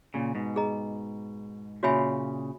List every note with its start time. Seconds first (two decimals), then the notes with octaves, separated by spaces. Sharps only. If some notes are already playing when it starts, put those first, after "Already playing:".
0.14 A#2 C#3
0.35 G#2 B2
0.56 G#4 D#5 A#5
1.83 A#2 C#3 F#4 C#5 E5 G#5 B5